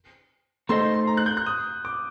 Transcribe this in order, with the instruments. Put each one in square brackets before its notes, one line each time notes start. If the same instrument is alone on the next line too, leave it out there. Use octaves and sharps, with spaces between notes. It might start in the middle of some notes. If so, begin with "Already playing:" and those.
[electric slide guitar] A3 D#4 A4 C5 D#5 [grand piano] C6
[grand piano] C6
A#5
F#6
G6
F#6
D#6
D6